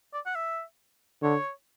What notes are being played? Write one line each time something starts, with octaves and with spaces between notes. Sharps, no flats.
D5
F#5
E5
D3 C#5